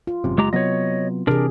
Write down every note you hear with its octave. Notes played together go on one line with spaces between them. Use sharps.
F4
G#1 F#2 C3
F#1 G#3 G4 A#5
C3 F#3 B3 C#5 D#5
C3 E3 D4 G#4 A#4